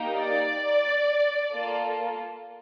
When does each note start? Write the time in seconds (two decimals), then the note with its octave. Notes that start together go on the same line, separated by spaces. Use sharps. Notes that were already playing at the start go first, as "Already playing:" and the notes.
Already playing: A#3 D#4 G4
0.18 D5
1.53 A#3 F4 A4